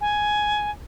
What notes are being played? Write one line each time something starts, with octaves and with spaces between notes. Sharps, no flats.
G#5